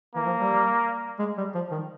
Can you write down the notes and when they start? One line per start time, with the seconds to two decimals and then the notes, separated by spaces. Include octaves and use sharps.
0.15 E3 A#3
0.26 F3
0.38 G3
1.19 G#3
1.38 G3
1.55 F3
1.71 D#3